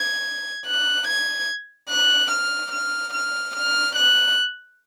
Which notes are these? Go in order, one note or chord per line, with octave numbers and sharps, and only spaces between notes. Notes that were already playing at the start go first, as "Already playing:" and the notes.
Already playing: G#6
F#6
G#6
F#6
F6
F6
F6
F6
F#6